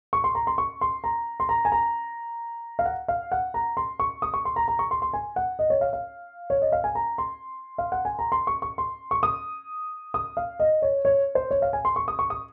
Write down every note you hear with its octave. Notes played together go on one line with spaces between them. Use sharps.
C#6
C6
A#5
C6
C#6
C6
A#5
C6
A#5
G#5
A#5
F5
F#5
F5
F#5
A#5
C6
C#6
D#6
C#6
C6
A#5
A#5
C#6
C6
C6
G#5
F#5
D#5
C#5
F5
F5
C#5
D#5
F5
G#5
A#5
C6
F5
F#5
G#5
A#5
C6
C#6
C#6
C6
C#6
D#6
D#6
F5
D#5
C#5
C#5
C5
C#5
F5
G#5
C6
C#6
D#6
C#6
D#6